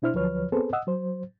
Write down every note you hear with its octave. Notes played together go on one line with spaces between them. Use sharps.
B2 D4 E4 C5 F6
D2 F3 F#3 B4 C#5 F6
B3 C4 G#4 A4 B4 C5
D#5 F#5 D#6 E6
F#3 C5